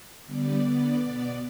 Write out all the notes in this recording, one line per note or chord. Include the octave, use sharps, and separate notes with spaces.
D3 G3 B3 D5
D3 B3 D5
B2 B3